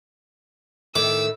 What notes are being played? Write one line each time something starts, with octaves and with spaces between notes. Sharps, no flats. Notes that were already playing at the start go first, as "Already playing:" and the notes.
A2 D#3 A3 D6 E6